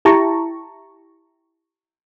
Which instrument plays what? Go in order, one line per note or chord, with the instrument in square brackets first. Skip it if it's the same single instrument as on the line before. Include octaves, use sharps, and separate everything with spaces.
[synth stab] E4 G4 A5 A#5 C#6